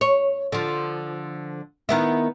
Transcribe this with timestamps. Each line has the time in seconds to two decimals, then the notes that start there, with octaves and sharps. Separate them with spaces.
0.01 C#5
0.52 D3 F3
1.89 D#3 B3 E4